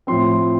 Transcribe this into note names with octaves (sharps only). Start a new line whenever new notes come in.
A2 F3 C4 C6